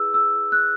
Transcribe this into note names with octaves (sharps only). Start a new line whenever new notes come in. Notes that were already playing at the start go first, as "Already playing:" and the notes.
Already playing: E4 G#4 B4 E6
E6
F#6